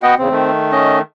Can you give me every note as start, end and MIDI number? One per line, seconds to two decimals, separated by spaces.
0.03 0.15 59
0.03 0.15 66
0.03 0.15 75
0.03 0.15 78
0.03 0.15 79
0.18 0.29 40
0.18 0.29 49
0.18 0.51 60
0.31 1.01 51
0.31 1.01 57
0.72 0.99 61
0.72 0.99 75